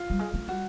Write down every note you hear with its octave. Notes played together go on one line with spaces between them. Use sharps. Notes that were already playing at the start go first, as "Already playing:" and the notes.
Already playing: F4
G3
G#3
A3
G3 F#4